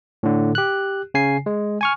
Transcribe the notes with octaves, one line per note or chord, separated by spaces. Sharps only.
A2 D3
G4 F#6
C#3 G#5 C7
G#3
G#5 C#6 F6